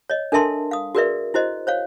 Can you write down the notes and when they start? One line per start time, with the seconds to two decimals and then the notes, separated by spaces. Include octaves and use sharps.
0.10 C#5 D#5
0.32 D4 A4 A#4 E5 A5 C6
0.71 F5 D#6
0.95 F#4 G#4 A#4 B4 D5 E5
1.34 E4 F#4 C5 D#5
1.67 C5 C#5 F5